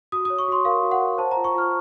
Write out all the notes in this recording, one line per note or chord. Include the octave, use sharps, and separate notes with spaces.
F#4 D#6
D#6
C#5
C#6
F#4 C6
A#4 F5
F#4
F#5
A#4
C5 A5
A#5
F4
C#6
F4 F6